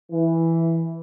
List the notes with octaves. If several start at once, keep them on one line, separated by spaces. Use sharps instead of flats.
E3